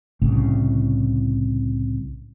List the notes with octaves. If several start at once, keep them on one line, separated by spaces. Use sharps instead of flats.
C2 A2 C#3